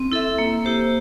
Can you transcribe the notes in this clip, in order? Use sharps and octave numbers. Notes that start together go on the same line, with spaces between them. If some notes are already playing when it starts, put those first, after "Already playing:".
Already playing: C4
E4 A4 E5
A#3
E4 G4 C5